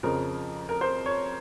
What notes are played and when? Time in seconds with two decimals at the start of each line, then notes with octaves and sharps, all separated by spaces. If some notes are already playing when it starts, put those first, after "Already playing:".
0.03 F2 C#3 F3 A#4
0.69 A#4
0.81 C5
1.06 C#5